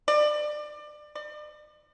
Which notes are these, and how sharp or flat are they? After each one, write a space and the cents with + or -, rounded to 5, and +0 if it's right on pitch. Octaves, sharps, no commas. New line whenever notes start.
D5 +25
D5 +40